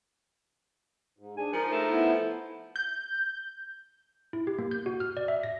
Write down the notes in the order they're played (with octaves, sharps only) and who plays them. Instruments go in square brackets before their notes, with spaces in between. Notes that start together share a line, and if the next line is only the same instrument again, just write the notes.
[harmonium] G#2
[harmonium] D4 G#4 [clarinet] G#5
[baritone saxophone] F3 [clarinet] D#4 [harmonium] A#4
[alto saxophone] A3 [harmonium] A#5
[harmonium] B3 E4 G#5
[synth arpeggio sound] G6
[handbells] E4
G4
A#3
G6
F#4
F6
D5
E5
A#6